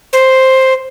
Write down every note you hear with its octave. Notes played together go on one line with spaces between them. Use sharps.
C5